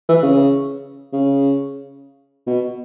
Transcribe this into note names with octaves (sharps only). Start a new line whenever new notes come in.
E3
C#3
C#3
B2